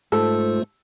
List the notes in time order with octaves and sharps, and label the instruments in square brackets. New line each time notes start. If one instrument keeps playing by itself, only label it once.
[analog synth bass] G#2 [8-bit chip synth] A3 F4 C5 [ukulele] A4